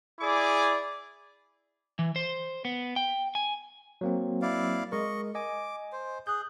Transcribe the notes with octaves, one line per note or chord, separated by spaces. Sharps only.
E4 G#4 D5 D6
E3
C5
B3
G5
G#5
F#3 A#3 C4
E4 D5 F5
G#3 A#4 D#5 C#6
D#5 G#5 D6
C5
G#4 F#6 G6